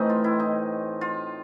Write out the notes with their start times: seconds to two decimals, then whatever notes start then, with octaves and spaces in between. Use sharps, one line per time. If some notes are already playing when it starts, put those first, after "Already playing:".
Already playing: A2 E3 A3 C4 D#4
0.10 F4
0.24 E4
0.40 D#4
1.01 F4